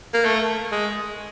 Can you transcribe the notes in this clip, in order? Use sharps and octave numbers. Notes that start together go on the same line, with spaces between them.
A#3
A3
G#3